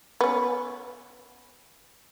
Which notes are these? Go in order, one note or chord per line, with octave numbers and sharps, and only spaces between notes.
B3 C#4